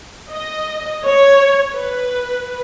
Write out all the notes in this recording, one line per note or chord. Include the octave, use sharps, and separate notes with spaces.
D#5
C#5
B4